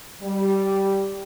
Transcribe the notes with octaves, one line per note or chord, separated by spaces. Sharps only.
G3